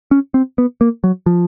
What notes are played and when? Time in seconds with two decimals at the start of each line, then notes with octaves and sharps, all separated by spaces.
0.11 C#4
0.34 C4
0.58 B3
0.81 A#3
1.04 F#3
1.26 F3